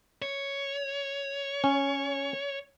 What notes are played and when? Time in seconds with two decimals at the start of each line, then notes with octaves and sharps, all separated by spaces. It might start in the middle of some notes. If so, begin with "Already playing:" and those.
0.22 C#5
1.64 C#4